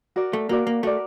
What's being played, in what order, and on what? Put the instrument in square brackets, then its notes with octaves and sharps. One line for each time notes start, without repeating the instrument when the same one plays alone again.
[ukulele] F#4 A#4 D5
[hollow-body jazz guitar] A3
[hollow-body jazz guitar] A#3 [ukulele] F#4 A#4 D5
[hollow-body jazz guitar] A#3
[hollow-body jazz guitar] A3 [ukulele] F#4 A#4 D5